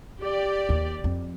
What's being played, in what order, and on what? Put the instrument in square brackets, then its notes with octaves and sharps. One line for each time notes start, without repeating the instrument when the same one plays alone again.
[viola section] G4 D5
[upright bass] D#2
F2